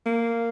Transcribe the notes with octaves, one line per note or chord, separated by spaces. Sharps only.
A#3